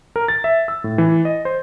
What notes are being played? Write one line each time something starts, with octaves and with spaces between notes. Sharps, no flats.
A#4
A6
E5
E6
A2
E3
D#5
C5